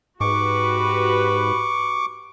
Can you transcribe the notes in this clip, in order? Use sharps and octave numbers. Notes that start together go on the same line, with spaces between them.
G#2 F#4 G4 B4 C#6 D6